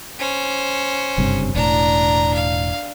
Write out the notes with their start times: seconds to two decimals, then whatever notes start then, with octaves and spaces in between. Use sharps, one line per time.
0.19 C#4 C5
1.18 F#1 G2 C3
1.55 E1 A2 D4 A#5
2.34 F5